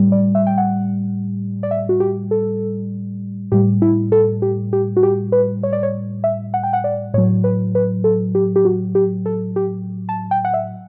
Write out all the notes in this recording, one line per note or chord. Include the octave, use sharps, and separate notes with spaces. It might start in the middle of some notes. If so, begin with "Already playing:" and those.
Already playing: A2 G3
D5
E5
G5
F#5
D5
E5
F#4
G4
A4
A2 G3 G4
E4
A4
G4
G4
F#4
G4
B4
C#5
D5
C#5
E5
F#5
G5
F#5
D5
A2 F#3 C#5
B4
B4
A4
G4
G4
F#4
G4
A4
G4
A5
G5
F#5
E5